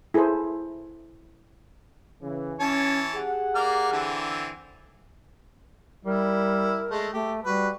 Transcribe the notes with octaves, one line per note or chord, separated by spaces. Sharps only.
E4 G#4 A4 B4 C5
C#3 E3
E3 C#4 C#5 A5
G4 G#4 F#5
A#3 D5 F6
D3 E3 C4
G3 E4 A#4
G#3 A3
A3 G4
G3 F#4 B4